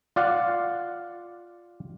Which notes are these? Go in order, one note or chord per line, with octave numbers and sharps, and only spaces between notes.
F4 D5 F5 F#5